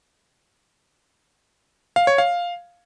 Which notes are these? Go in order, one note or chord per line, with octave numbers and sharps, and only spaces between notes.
F5
C#5
F5